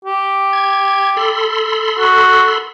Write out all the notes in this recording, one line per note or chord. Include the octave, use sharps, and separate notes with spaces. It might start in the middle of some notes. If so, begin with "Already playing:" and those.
G4
G#6
A4 B5 C6
F#4